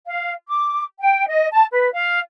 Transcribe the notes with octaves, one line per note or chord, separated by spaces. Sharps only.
F5
D6
G5
D#5
A5
B4
F5